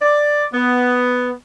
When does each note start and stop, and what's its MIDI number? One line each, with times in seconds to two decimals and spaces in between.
0.02 0.46 74
0.53 1.31 59